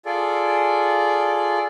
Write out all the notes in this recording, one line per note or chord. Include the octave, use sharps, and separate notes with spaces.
F4 G#4 A4 D5